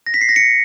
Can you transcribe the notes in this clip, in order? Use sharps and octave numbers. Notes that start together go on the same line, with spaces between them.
A#6
B6
C7
A#6
C#7